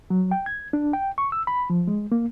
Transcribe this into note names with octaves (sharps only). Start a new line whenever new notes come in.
F#3
G5
G#6
D4
G5
C#6
E6
B5
F3
G#3
A#3